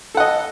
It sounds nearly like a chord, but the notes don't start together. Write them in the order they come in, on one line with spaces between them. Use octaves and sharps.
A4 F#5 D#5